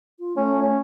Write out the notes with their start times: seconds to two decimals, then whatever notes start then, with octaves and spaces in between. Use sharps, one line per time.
0.20 F4
0.37 A3 C#4
0.61 C#4